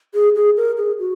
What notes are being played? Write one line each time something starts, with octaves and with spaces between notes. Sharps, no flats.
G#4
G#4
A#4
G#4
F#4